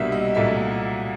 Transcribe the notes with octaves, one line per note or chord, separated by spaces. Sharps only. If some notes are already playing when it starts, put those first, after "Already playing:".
Already playing: C2 B2 G3 A#3 D4 E5
D#5
C2 A#2 F#3 A3 E5